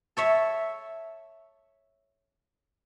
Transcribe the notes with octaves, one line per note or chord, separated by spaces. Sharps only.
A4 C#5 E5